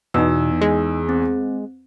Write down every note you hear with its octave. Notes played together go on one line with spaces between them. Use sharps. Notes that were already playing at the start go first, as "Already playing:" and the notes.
E2 B2 D#4 E6
G#3
C4